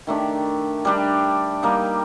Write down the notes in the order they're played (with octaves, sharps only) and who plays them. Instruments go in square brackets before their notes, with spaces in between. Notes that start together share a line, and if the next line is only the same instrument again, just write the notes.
[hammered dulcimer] D#3 A3 D4 G4
G3 D4 G4
G3 A#3 D#4